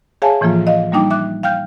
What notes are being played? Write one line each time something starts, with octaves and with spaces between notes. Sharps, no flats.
G#4 C#5 E5 F5 G#5 A5
A2 E3 F3 A#3 F4
D#5 F5
G3 A#3 D4 D#4 G5 D6
E5 D6 F#6
F5 G5 F6 G6